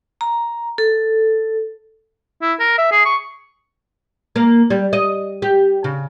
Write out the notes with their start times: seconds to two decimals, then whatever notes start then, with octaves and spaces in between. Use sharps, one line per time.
0.21 A#5
0.78 A4
2.42 E4
2.60 A#4
2.78 E5
2.92 G#4
3.05 C#6
4.36 A#3
4.70 G3
4.93 D#5
5.42 G4
5.84 C#3